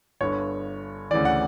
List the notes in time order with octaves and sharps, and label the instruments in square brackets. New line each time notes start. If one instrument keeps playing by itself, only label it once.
[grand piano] G1 G2 D3 C#5
D2 C#3 E3 D5
F#5